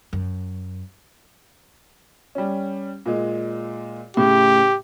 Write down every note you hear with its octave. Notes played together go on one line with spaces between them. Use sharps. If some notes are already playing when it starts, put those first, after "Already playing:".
F#2
G3 C#4
A#2 G#3
A2 C#3 G4